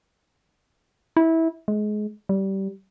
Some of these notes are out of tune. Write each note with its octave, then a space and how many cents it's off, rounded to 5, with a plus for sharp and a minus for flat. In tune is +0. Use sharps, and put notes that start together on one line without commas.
E4 -20
G#3 +25
G3 -20